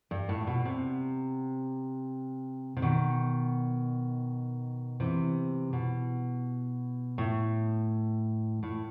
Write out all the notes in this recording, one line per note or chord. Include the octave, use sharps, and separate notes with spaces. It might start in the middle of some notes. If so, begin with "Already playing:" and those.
G2
A2
B2
C3
C3
B2 D#3
C3 E3
B2
A2
A2